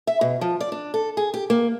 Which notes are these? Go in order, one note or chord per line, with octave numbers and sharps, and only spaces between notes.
E5
B2
F3
D5
D4
A4
G#4
G4
A#3